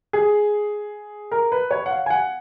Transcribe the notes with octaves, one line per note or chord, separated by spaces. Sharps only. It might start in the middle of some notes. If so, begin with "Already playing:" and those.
G#4
A#4
B4
C#5
F#5
F5
G#5
F#5